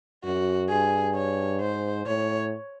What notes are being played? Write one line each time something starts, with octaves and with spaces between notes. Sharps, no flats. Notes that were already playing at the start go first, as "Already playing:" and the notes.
F#2 F#4
G2 G#4
C#5
G#2 C5
A2 C#5